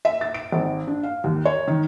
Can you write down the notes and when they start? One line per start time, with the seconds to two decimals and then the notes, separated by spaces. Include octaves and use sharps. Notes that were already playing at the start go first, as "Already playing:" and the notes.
0.05 E5
0.21 A6
0.34 D7
0.52 G#1
0.87 D4
1.03 F5
1.24 D#2
1.45 C#5
1.67 D#3